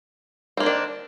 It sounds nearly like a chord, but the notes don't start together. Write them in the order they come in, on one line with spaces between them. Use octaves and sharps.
C4 A#3 D#3 D4